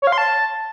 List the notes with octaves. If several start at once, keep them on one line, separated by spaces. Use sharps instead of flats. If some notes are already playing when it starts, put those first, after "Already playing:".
C#5
F5
C6
A5